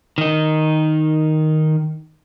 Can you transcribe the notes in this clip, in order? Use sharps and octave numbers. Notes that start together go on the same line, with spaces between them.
D#3 D#4